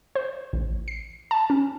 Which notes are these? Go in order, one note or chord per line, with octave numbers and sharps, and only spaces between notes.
C5
A1
C7
A5
C#4